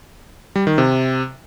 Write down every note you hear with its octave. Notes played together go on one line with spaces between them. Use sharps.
G3
D#3
C3